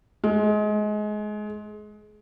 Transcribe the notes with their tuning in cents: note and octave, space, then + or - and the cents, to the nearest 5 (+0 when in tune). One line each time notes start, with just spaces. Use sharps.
G#3 +25